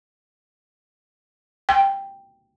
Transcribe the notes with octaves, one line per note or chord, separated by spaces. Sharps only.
G5